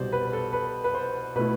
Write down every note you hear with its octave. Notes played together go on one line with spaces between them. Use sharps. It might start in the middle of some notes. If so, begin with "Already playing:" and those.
Already playing: C2 B2 G3 C5 D5
B4
A4
B4
B4
C5
B2 A3 E4 B4